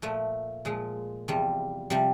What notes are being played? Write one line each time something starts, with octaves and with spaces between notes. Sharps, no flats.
A#2 F3 A3
A#2 F3 G#3
E2 C3 F3 G3
C3 F3 G3